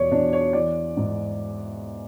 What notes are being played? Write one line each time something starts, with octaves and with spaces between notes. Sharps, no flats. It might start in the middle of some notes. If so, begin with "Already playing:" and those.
Already playing: E2 B2 C#5 D5
E2 D4
C#5
E3 D5
G#2